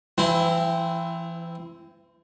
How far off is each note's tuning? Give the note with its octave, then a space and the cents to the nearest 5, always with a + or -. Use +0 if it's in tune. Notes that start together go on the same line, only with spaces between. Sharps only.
E3 +40 C4 +0 E4 +0